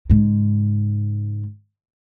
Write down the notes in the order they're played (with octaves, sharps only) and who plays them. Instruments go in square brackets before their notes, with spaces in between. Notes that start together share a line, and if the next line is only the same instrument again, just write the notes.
[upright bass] G#2 C#3